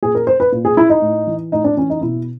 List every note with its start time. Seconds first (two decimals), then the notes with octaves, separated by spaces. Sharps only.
0.03 A#2 G#4
0.15 A#4
0.27 C5
0.40 B4
0.52 A#2
0.65 G#4
0.77 E4
0.90 D#4
1.02 A2
1.27 E3
1.52 A2 D#4
1.64 D4
1.77 E3 C#4
1.90 D#4
2.01 B2 E4